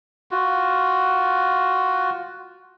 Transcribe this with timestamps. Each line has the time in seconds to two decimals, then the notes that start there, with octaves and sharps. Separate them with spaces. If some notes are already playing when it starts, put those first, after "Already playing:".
0.31 F4 F#4